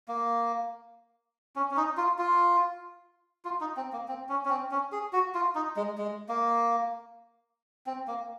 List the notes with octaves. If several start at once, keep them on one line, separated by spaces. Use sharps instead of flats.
A#3
C#4
C#4
D#4
F4
F4
F4
D#4
C4
A#3
C4
C#4
C#4
C4
C#4
G#4
F#4
F4
D#4
G#3
G#3
A#3
C4
A#3